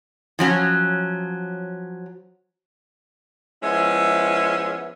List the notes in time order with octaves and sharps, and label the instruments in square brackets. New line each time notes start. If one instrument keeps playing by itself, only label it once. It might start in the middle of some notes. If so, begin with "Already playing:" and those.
[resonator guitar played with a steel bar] F3 F#3 C#4
[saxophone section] F3 G#3 B3 C#4 E4 E5